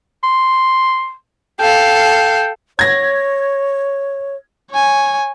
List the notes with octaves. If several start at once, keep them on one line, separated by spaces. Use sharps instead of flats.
C6
A4 F5 G5
C#5 G#6 A#6
C#5 G#5